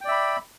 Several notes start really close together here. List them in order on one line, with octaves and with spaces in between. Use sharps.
G5 D5 E5 B5